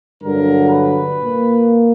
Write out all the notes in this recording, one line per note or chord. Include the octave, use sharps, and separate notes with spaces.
G2 D3 F#3 A#4
B4
A#2 A#3